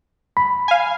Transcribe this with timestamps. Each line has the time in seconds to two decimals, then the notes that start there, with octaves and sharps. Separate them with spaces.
0.37 B5
0.68 F5 G#5